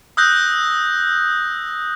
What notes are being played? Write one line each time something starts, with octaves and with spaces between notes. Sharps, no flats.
D#6 E6 F#6 G6 A#6